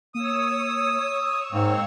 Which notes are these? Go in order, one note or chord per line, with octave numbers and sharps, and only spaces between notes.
A#3 C#5 D#6 E6
G#2 D#3 G#3 A#3 C4